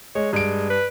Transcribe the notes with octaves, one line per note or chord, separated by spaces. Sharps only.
G#3 C#5
G2 G#3 D7
B4